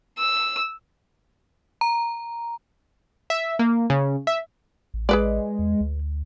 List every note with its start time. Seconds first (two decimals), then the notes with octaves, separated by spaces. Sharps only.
0.18 E6
1.81 A#5
3.30 E5
3.59 A#3
3.90 C#3
4.27 E5
4.94 A1
5.09 G#3 G#4 B4 D5
5.59 E2
5.81 D2